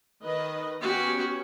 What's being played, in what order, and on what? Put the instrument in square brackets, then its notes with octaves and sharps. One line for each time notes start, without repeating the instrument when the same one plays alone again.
[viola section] D#3 B4 D#5
[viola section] B3 C#4 [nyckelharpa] F#4 G4